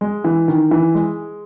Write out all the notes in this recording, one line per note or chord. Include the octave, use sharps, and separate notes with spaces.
G#3
E3
D#3
E3
G#3